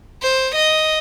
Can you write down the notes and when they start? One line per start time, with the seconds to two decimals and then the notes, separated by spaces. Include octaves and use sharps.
0.22 C5
0.55 D#5